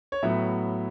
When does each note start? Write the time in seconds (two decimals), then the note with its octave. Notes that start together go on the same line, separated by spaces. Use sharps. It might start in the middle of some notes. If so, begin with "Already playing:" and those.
0.12 C#5
0.22 A2 F#3 B3 E5